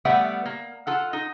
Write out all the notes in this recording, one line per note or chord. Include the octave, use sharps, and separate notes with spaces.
G3 A3 B3 D5 E5 F#5
A#3
F4 A4 F#5
D#4